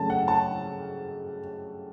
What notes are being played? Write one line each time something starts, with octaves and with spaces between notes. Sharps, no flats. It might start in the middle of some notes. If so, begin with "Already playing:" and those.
Already playing: C#3 F#3 A3 C#4 A5
F#5
A5